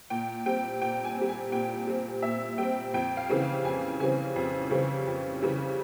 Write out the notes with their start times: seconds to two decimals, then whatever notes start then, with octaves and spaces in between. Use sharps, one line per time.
0.10 A#2 G5
0.46 G3 C4 G5
0.82 A#2 G5
1.05 G#5
1.16 C4
1.21 G3
1.29 G#5
1.52 A#2 G5
1.87 G3 C4
2.22 A#2 E5
2.58 G3 C4 G5
2.94 F2 G5
3.17 F5
3.29 C#3 E3 G3 C4
3.42 F5
3.64 F2 G#5
4.00 C#3 E3 G3 C4 G#5
4.36 F2
4.71 C#3 E3 G3 C4
5.07 F2
5.41 C#3 E3 G3 C4